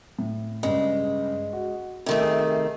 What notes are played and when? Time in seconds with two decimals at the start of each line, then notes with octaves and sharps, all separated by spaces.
0.19 A2
0.63 G2 C#3 G#3
1.53 F#4
2.06 C3 D#3 A3
2.21 G#4